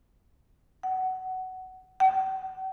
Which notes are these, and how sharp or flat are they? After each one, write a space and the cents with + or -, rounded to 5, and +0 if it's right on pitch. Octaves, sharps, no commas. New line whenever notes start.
F#5 +15
F#5 +45